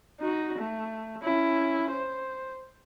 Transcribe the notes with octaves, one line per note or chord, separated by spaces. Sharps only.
D#4 F#4
A3
C#4 E4
C5